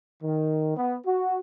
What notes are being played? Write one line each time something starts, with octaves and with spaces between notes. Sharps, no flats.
D#3
B3
F#4